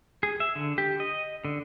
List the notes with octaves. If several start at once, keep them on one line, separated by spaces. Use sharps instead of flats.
G#4
E5
D3
G4
D#5
D3